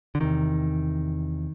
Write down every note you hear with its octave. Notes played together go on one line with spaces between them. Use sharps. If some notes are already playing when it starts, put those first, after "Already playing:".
D3
E2 C3 D#3